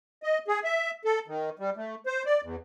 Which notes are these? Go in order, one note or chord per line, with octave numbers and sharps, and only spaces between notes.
D#5
G#4
E5
A4
D#3
G3
A3
C5
D5
E2